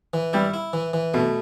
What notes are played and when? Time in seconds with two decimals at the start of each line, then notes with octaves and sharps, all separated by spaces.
0.14 E3
0.33 G3 E4
0.54 E4
0.73 E3
0.93 E3
1.14 B2 A3